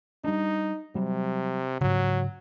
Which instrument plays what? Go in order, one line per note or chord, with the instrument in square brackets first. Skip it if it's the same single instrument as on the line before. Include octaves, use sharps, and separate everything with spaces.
[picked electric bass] G3 A#3 D4 [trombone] D#4
[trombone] C3 [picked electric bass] F#3 G3
[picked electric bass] G#2 C#3 [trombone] F#3